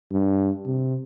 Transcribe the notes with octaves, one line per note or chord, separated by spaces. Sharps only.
G2
C3